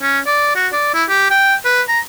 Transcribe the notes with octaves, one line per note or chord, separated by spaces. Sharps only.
C#4
D5
F#4
D5
E4
G4
G5
B4
A#5